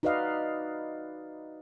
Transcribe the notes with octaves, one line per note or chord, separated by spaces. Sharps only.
D#4 F#4 B4 D5 D#5 F5